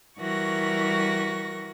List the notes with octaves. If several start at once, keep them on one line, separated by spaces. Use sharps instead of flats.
E3 G3 F#4 A#4 C#6 A#6